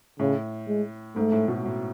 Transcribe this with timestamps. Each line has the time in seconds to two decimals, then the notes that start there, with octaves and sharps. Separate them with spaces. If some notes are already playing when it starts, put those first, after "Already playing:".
0.19 A2 C#3
0.67 G#3
1.16 G#2 A3
1.32 A2
1.48 B2
1.65 A2